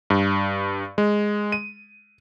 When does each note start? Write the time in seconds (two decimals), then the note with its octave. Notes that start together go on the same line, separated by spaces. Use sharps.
0.10 G2
0.98 G#3
1.52 D#7